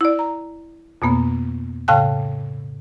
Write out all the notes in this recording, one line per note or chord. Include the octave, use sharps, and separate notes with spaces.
E4 D5
A#5
F2 B2 A#3 B3
A2 C#3 F5 G5 A5 F#6